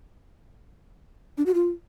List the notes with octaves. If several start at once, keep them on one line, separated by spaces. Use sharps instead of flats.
D4
F#4
F4